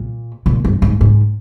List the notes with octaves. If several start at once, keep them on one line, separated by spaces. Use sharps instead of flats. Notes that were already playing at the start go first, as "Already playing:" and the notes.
Already playing: A#2
A#2
G2
G#2
G#2